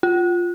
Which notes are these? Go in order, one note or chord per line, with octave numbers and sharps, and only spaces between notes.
F4